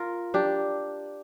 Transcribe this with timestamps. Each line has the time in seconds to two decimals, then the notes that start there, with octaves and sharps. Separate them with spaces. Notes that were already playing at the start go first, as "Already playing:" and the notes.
Already playing: F4 A#4
0.34 D4 G4